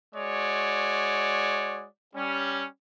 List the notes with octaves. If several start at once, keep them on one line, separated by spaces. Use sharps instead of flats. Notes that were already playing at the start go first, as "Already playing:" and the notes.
G#3 F#4 C#5 D5
G3 C#4